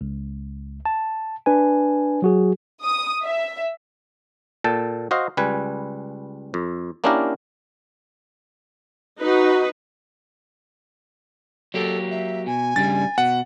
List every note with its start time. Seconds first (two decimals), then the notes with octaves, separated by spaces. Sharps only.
0.01 C#2
0.86 A5
1.46 D4 B4 G#5
2.22 F#3 F#4 G#4
2.83 D#6
3.24 E5
4.64 A#2 A4 G5 A5
5.11 F#4 C5 D#5 F5
5.37 C#2 G3 B4 G#5
6.54 F2
7.04 A#3 C#4 D4 E4 G4 A#4
9.21 D#4 F#4 B4
11.74 F#3 A#3 G4 A4
12.11 E5
12.46 B2 G#5
12.76 G2 C#3 G3 A6
13.18 B2 F#5